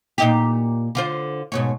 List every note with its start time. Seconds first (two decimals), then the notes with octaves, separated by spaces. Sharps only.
0.18 A#2 D#4 G4
0.95 D3 F4 C5
1.52 G#2 B2 C#5